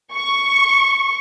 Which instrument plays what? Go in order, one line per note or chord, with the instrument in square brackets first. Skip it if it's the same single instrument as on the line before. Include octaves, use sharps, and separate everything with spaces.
[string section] C#6